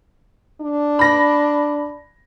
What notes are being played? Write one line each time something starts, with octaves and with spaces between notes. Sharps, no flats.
D4
B5 A#6